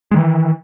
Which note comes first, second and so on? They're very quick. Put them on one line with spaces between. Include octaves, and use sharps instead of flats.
G#3 D#3 E3